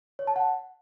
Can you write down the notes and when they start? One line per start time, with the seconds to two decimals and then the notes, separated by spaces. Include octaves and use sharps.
0.19 C#5
0.27 A5
0.36 F#5